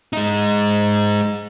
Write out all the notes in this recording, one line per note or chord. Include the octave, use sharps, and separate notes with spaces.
G#3 D#4